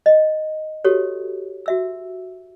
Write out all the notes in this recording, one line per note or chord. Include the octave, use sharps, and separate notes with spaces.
D#5
F#4 G4 A4 C#5
F#4 E5 E6